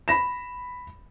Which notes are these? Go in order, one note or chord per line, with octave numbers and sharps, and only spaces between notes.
B5 A#6 E7